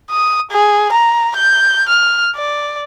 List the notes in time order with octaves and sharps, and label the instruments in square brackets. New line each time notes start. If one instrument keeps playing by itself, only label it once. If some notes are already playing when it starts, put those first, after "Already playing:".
[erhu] D#6
G#4
A#5
G6
F6
D5